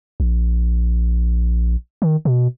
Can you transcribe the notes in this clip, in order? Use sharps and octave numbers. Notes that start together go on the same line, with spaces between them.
A#1
D#3
B2